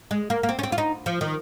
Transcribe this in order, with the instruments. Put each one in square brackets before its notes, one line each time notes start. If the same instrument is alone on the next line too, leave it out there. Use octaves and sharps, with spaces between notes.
[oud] G#3
A#3
A#3
C4
C#4
C4
F4
D#4
F3
D#3